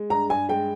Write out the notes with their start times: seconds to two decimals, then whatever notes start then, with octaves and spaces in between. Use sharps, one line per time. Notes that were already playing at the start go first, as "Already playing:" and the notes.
Already playing: G#3
0.10 G2 A#5
0.30 G2 G#5
0.49 G#3 G5